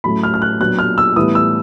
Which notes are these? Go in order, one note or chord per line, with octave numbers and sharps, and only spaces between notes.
A2 F#3 A3 C#4 B5
F6
F6
F#6
A#2 F#3 B3 D4 F#6
F6
E6
A2 E3 G3 B3 D#6
E6